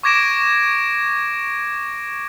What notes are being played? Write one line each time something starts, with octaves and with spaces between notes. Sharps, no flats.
C#6 D6 G#6 A#6 D7 E7